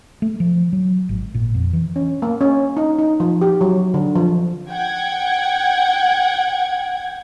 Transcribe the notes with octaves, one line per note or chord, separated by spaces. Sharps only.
A3
F3
F#3
G#1
A#2
F2
E3
C#4
A#3
C#4
D#4
D#4
F3
G4
F#3
D3
F3
F#5 G5 G#6